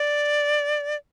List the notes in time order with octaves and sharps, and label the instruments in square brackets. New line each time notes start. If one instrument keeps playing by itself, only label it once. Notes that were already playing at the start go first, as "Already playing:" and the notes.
Already playing: [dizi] D5